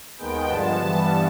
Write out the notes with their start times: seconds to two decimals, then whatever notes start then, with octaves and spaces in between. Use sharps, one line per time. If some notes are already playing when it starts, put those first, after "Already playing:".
0.18 D#2 D#3 G#3 B3 G5
0.49 G2 D3 F3 G#3 B3 A5
0.79 G2 E3 G3 B3